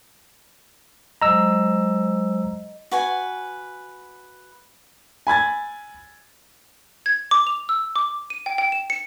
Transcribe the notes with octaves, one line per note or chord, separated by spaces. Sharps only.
F#3 G#3 C5 D#5 A#5 E6
F#4 B4 G#5
G#5 B5 G#6 A6
G#6
D6
F7
E6
D6
D#7
G5
G5
E7
C#7